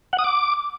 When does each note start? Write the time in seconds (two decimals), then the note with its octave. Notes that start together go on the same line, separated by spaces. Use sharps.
0.13 F#5
0.19 D#6
0.24 D6